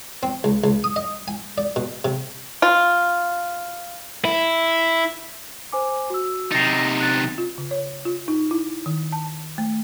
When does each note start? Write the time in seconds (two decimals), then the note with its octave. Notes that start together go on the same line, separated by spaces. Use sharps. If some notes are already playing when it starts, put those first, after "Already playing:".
0.23 C4
0.44 C#2
0.64 C#2
0.84 D#6
0.96 D#5
1.28 G#5
1.58 D5
1.76 B2
2.05 C3
2.62 F4
4.25 E4
5.72 C5 G#5 D6
6.10 F#4 E6
6.52 C3 D#4 A6 A#6 C7
7.00 F#6 A6
7.38 F4
7.58 C#3
7.71 C#5
8.05 F4
8.28 D#4
8.51 E4
8.86 D#3
9.13 A5
9.58 A3